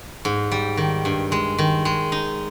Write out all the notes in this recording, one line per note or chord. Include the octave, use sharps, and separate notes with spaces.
G#2
G3
D#3
G2
G#3
D#3
G#3
D#4